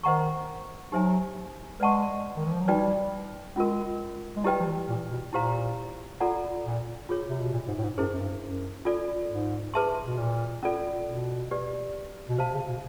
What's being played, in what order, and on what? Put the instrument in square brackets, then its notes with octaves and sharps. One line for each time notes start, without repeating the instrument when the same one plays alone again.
[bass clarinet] D#3 [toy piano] C5 D#5 F#5 A#5 C#6
[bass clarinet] F#3 [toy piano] D#4 G4 C5 E5 G#5
[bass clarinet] G#3 [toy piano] B4 D5 F#5 A5 C#6
[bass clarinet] D#3
E3
F3
F#3
[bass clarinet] G3 [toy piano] D#4 F#4 B4 D5 G5
[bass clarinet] G#3 [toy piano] C#4 F4 A#4
[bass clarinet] G#3
[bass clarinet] G3 [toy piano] E4 G4 B4 D#5 G5
[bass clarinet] F3
E3
A#2
B2
[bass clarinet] A#2 [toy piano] E4 G4 C5 F5 A#5
[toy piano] F4 A4 D5 F#5 A#5
[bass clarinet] A#2
[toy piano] F4 G#4 C#5
[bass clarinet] C3
B2
A#2
G#2
A2
G#2
[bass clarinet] F#2 [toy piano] E4 G#4 C5
[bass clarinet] F#2
G2
F#2
[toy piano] F4 A4 D5
[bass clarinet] G#2
[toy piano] G#4 B4 E5 A5 C6
[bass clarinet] B2
A#2
[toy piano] C#4 F4 A4 D5
[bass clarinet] B2
[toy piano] G4 B4 D5
[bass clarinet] B2
[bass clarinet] C3 [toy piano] C5 F5 A5
[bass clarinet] C#3
B2